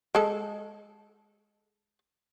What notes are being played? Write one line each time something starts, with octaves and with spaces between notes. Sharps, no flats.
G#3 A4